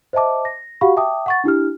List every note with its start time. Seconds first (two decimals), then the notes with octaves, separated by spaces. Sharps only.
0.13 C5 D#5 E5 A5 D6
0.45 A#6
0.81 F#4 G4 F5 F#5 B5 C#6
0.97 E5 G5 A5 D6 D#6
1.26 F#5 C#6 A6
1.44 D4 E4 G4 F6